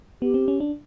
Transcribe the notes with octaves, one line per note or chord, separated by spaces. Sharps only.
B3 G4
C4
C#4
D4